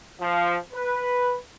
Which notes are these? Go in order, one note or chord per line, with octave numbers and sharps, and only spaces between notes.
F3
B4